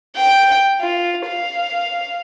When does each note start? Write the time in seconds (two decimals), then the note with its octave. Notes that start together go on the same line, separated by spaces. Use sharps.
0.16 G5
0.81 F4
1.27 F5